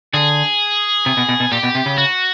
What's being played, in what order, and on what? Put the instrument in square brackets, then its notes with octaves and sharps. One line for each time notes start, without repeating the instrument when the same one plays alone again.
[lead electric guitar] D3 [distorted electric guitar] G#4
[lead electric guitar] C3
B2
B2
B2
[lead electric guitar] A#2 [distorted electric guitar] G4
[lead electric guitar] B2
C3
C#3
[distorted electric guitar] F#4